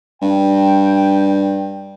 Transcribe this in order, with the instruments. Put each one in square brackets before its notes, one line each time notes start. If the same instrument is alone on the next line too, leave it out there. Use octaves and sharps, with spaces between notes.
[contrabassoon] G2 [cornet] G5